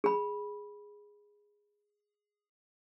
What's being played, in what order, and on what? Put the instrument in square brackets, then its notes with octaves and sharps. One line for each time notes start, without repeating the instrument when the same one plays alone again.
[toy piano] G#4 B5